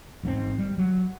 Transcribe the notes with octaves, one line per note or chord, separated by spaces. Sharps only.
A1 G#2 B2 C4
G3
F#3